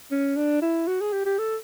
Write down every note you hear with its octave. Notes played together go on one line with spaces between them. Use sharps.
C#4
D4
E4
F#4
G#4
G4
G4
A4